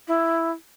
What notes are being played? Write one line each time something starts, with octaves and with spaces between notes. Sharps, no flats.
E4